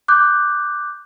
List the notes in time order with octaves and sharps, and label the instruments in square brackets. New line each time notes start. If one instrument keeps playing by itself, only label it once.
[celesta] D6 F#6 G6